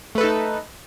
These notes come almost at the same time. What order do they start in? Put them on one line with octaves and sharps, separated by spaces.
A3 B4 A4 D#4